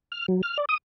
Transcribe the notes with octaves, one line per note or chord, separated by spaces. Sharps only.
F6
F#3
F6
D5
D#6